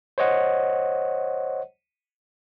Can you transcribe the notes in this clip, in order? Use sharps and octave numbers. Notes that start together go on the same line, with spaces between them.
C5 C#5 D#5 F#5